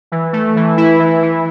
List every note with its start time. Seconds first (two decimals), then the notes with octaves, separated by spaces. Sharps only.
0.12 E3
0.33 A3
0.56 E3
0.77 E4
1.00 E3
1.22 E3